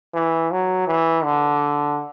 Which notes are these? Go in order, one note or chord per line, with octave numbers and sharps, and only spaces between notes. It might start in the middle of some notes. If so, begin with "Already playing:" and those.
E3
F#3
E3
D3